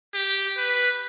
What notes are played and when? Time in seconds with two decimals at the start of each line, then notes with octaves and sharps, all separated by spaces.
0.14 G4
0.58 B4